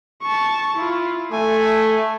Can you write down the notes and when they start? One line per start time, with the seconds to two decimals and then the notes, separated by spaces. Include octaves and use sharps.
0.22 A5 C#6
0.76 E4 F4
1.32 A3 G#5